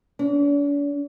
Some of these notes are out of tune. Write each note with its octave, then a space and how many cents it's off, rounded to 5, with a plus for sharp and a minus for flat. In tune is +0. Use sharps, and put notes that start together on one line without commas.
D4 -45